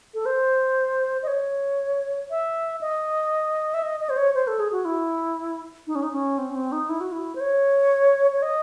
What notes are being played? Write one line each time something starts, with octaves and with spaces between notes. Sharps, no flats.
A4
C5
D#5
C#5
E5
D#5
E5
D#5
D#5
C5
C#5
C5
A4
G#4
F#4
E4
D#4
C#4
D#4
C#4
C4
C#4
C4
D#4
E4
F#4
E4
C5
C#5
C#5
D#5